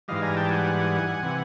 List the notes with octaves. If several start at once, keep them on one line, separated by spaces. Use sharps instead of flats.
G#2 E3 G3 D#5 F5
G#5 A#5
G5 A5
F#5 G#5
C3 E3